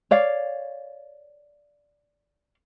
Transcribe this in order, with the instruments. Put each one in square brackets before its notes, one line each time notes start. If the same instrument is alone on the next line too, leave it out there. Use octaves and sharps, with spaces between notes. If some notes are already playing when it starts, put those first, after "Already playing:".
[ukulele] C#5 D5 F5